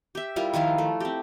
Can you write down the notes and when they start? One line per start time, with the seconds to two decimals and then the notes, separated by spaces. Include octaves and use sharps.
0.15 G4 E5
0.36 G3 E4 F4 A#4
0.54 D#3 F3 E4 F4
0.78 A3
1.00 C4 G4